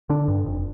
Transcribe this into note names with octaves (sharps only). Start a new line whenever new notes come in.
D3 D4
G2
F1